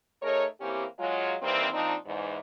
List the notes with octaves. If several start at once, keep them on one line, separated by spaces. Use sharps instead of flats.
A3 D#4 G#4 A#4 C#5
E3 A#3 C4 C#4 G4
F#3 G#3 F4
D#3 E3 G3 A#3 C4
A#2 F3 C4 D4 D#4
E2 G#2